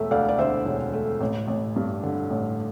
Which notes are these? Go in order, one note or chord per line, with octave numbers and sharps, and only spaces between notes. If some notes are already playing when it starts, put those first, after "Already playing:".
Already playing: E1 A3 E5
D2 D5 F5
D5
D3 C5 E5
E1
A3
A1
A1
G2
D3
A1